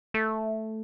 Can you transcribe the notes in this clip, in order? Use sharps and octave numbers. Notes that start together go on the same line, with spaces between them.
A3